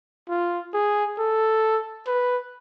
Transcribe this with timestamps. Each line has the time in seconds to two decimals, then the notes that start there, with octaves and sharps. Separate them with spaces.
0.29 F4
0.74 G#4
1.18 A4
2.07 B4